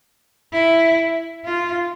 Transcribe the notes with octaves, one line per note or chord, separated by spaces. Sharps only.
E4
F4